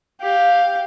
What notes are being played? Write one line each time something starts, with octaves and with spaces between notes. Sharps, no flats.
G4 F5